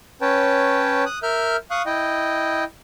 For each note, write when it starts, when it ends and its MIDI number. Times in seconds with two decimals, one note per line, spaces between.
0.21 1.04 61
0.21 1.04 71
0.21 1.04 73
0.21 1.04 79
0.21 1.04 81
1.06 1.19 87
1.06 1.19 90
1.23 1.56 70
1.23 1.56 76
1.23 1.56 89
1.23 1.56 91
1.71 1.82 77
1.71 1.82 85
1.71 1.82 87
1.71 1.82 90
1.86 2.64 64
1.86 2.64 75
1.86 2.64 79